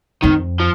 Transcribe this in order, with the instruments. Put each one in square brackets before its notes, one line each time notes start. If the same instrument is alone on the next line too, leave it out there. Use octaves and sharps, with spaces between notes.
[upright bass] F2 [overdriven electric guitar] D#3
[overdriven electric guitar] F3